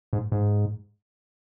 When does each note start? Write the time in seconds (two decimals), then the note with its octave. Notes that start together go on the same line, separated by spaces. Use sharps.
0.13 G#2
0.32 G#2